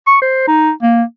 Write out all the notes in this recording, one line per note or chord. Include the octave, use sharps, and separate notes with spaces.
C#6
C5
D#4
A#3